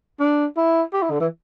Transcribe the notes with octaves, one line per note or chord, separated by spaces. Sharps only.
D4
E4
G4
E4
D3
E3